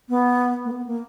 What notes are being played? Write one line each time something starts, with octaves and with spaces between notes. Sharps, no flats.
B3
A#3
B3
A#3